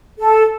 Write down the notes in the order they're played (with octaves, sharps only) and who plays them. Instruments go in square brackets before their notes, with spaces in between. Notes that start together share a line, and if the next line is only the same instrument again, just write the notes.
[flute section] A4